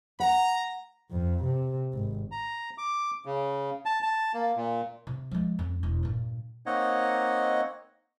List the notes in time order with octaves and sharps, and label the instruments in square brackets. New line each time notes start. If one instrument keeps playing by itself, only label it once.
[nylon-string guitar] F#5 [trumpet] A#5
[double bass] F2
C3
G#1
[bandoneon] A#5
D6
C#3
A5
A5
A#3
A#2
[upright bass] C3
F3 G#3
F2 C#4
E1
G2 A#2
[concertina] A#3 C4 D#4 C#5 D#5 F#5